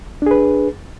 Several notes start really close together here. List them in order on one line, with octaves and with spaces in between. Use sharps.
D4 G#4 B4